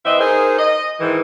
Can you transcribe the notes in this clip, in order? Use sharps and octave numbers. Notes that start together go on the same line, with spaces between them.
E3 C4 D#5 E5
D#4 G#4 A#4 C5
D#5
G#2 D#3 E3